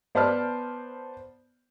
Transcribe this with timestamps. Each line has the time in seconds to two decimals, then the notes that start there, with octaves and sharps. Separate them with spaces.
0.15 B3 C5 D5 A5 B5 F6